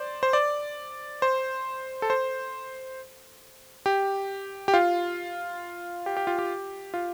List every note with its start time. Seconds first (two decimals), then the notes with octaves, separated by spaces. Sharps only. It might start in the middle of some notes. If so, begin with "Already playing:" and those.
Already playing: C5 D5
0.23 C5
0.33 D5
1.22 C5
2.02 A4
2.10 C5
3.86 G4
4.68 G4
4.74 F4
6.06 G4
6.17 G4
6.27 F4
6.39 G4
6.94 F4